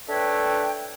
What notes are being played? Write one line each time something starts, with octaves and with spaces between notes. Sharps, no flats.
D4 A4 B4 C#5 E5 G5